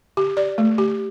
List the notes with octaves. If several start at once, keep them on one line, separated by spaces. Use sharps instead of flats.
G4
D5
A3
G4